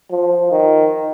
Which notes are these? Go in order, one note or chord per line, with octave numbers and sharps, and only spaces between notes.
F3
D#3